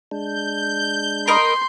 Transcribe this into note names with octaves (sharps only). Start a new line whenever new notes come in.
G#3 D4 G6
A#4 D#5 B5 C6